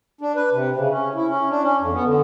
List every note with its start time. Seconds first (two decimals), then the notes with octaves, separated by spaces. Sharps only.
0.21 D4
0.36 B4
0.53 C3
0.76 C#3
0.91 C#4
1.15 E4
1.28 C#4
1.50 D4
1.62 C#4
1.80 F2
1.93 B3
2.04 D3